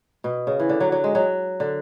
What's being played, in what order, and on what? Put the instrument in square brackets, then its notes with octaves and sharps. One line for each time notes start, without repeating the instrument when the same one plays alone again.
[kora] B2
C#3
E3
D3
F#3
F#3
G#3
F#3
D3